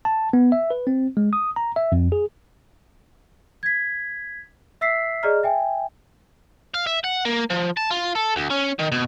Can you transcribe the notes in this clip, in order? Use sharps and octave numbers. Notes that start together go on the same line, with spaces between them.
A5
B3
E5
B4
C4
G#3
D#6
A#5
E5
F2
G#4
G#6 B6
E5 E6 B6 C7
G#4 D5 D#5 A#5 F6
E5 G5 G#5
F5
E5
F#5
A#3
F3
A5
F4
A4
D2
C#4
D#3
B2